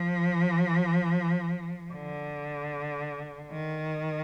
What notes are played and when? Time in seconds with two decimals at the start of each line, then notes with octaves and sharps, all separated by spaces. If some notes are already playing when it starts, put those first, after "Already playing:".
Already playing: F3
1.93 D3
3.51 D#3